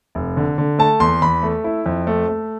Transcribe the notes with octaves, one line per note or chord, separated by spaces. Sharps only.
F1
D3
D3
A3 A5
E2 C6
E2 B5
A3
E4
F2
A3
A3